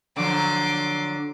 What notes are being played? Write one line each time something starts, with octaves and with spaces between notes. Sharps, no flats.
D3 F3 F#3 C6 D6